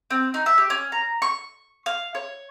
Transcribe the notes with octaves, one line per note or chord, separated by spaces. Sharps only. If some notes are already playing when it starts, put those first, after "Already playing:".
C4
D#4
E5
G4
C#4
A#5
C#6
F5
C#5